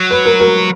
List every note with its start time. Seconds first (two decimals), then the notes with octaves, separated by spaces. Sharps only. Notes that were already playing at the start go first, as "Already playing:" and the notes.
Already playing: F#3
0.11 B4
0.25 A#4
0.40 A#4